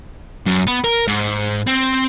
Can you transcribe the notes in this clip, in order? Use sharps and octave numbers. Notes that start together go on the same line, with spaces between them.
F#2
B3
A#4
G#2
C4